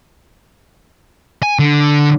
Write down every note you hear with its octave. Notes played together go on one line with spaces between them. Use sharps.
G#5
D3